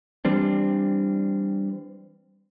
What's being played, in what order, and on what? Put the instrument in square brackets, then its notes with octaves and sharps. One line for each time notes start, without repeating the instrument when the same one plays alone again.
[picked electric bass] E3 G3 C4 D4